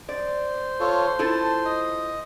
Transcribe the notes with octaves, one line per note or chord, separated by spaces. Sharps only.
C5 D5
F4 A4 C#5
E4 F4 A4 A5
D#5